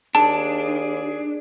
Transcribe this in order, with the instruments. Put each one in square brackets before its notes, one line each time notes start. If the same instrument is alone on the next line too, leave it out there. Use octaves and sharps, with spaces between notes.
[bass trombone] D#2 [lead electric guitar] D4 [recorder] G#4 [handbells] A5